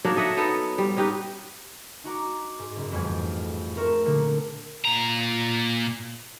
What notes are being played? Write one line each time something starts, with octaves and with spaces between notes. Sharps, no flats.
F#3 A#3 D4 D#4
A4 D#5 E5 F#5
B3 D#4 A4
G3
C#4 D#4 G4 B4
D#4 F#4 A#5 D6
G#2
F#1
A1 F2 G#2 G3 F#5 G#6
A3 C4 A#4 C#6 E7
A#2 D3 F#3 F#4 A#4
A#2 A#5